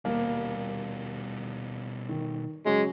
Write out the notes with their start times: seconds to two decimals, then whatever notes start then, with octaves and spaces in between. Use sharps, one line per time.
0.05 D#1 B2 G3 A#3
2.09 D#3
2.66 C#3 F#3 G#3